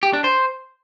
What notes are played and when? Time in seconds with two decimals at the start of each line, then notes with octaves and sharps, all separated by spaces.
0.03 G4
0.13 D4
0.24 C5